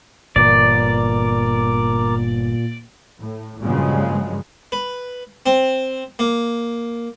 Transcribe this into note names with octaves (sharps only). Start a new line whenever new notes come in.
G1 G2 A#2 E3 A#4 D5 A#5 D6
A2
G2 A#2 C#3 F3 F#3 G#3
B4
C4
A#3